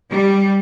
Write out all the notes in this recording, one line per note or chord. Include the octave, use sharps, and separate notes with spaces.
G3